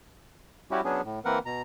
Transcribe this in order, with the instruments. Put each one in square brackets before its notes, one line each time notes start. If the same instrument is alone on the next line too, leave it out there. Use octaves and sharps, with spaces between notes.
[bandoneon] G3 C#4 E4 F#4 G4
F#3 B3 C#4 D4 G#4
A2
E3 A#3 C4 A#4 B4 F#5
B2 A#5